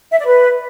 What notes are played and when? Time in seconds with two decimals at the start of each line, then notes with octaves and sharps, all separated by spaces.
0.12 E5
0.19 D5
0.26 B4